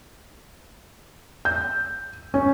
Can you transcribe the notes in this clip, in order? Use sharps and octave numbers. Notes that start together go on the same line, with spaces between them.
G6
C#4